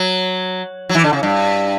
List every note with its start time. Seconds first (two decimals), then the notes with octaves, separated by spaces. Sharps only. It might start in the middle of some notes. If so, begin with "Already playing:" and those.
Already playing: F#3
0.89 F#3
0.95 E3
1.04 D3
1.13 C#3
1.23 G2